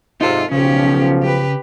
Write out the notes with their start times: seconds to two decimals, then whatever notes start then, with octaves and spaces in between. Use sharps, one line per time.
0.21 G#2 C3 D#4 F4 A4
0.52 B1 C#3 F3 C#4 G4
1.23 G4 B4